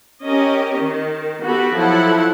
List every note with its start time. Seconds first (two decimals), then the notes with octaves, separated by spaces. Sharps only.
0.22 C#4 G4 A#4 D#5
0.78 D#3
1.43 B3 F#4 G4 A4 B5
1.74 F3 F#3 E4 A4 F#5